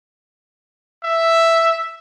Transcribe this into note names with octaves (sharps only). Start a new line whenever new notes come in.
E5